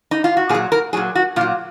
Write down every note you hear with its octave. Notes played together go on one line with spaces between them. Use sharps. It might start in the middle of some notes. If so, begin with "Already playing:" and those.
D#4
F4
F#4
A#2 G#4
F#3
A#4
A#2 F#3 G#4
F#4
A#2 F#3 F4